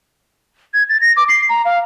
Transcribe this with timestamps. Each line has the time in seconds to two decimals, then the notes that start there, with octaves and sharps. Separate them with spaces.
0.74 G#6
0.89 A6
1.01 A#6
1.17 D6
1.29 C7
1.49 A#5
1.65 F5